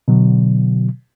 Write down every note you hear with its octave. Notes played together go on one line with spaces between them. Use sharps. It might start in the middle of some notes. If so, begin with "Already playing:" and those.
B2 D3 F#3